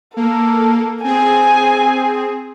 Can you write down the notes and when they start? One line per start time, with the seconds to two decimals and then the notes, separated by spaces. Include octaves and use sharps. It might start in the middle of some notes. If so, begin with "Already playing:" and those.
0.17 A#3 A4
1.04 C4 G#4 G#5